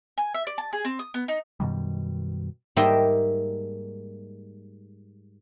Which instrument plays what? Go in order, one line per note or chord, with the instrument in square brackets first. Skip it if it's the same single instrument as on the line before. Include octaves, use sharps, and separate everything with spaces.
[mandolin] G#5
E5
D5
A5
G#4
C4
D#6
B3
D#4
[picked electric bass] F#2 B2 D#3 G3
[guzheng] G#2 G3 A#3 D#5 E5 G5